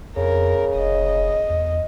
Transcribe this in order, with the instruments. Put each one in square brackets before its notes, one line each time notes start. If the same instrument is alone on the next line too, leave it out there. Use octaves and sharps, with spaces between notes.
[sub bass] F2 [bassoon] C#3 [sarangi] A#4
[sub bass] F1 [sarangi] D#5
[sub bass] E2